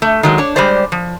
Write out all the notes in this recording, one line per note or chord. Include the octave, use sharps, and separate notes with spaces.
A3
D#3 F#3 G#3
D4 C#5
G3 G#3 G4 C5 D5
F3